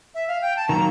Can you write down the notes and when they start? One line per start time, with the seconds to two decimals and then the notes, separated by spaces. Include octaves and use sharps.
0.14 E5
0.27 F5
0.41 G5
0.56 A5
0.68 D#3 F#3 A#3 A#5